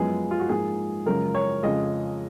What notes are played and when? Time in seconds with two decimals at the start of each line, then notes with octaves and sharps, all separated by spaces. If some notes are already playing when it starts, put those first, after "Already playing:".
Already playing: F#2 F3 G#3 B3 G#4
0.31 F4
0.40 F#4
0.49 G#2 F3 A#3 G#4
1.06 F#2 C#3 F3 G#3 A#4
1.35 C#5
1.63 F2 C#3 F3 G#3 D#5